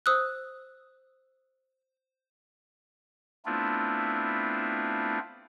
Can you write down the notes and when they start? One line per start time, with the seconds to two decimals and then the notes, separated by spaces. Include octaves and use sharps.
0.06 C5 D#6 E6 F#6
3.46 A3 B3 C4 D4 E4 F4